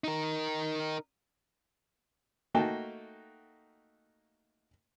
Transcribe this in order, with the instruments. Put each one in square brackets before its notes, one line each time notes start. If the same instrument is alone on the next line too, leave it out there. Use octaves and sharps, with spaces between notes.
[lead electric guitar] D#4 A#4
[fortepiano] A3 A#3 D#4 F#4 G5 A5